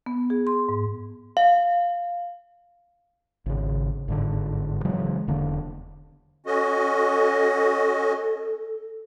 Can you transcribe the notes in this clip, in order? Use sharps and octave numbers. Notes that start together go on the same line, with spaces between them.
B3
G#4
C6
G#2
F5
G#1 C#3
G1 G#2 D3
C#3 E3 F#3 G#3
E1 D3 A#3 D4
C#4 F#4 A4 D#5